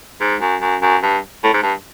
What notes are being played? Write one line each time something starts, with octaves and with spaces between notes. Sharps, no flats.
G#2
F#2
F#2
F#2
G2
A2
G#2
G2